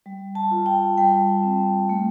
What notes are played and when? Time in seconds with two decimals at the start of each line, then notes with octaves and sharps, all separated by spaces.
0.06 G3
0.35 A5
0.51 F4
0.66 G5
0.97 G3 G5
1.43 C4
1.89 A3